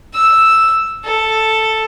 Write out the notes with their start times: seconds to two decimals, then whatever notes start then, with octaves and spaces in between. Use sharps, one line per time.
0.14 E6
1.05 A4